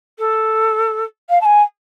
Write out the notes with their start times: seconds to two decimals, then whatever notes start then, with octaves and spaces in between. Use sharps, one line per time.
0.18 A4
1.29 F5
1.41 A5
1.45 G#5